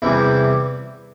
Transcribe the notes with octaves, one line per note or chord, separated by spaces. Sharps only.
E2 C3 E3 G3 E4